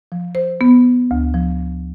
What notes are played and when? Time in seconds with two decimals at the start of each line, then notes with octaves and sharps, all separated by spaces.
0.12 F3
0.35 C5
0.61 B3
1.11 D2
1.34 F3